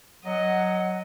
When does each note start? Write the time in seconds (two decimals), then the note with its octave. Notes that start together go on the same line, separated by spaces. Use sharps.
0.24 F#3 D#5 F#5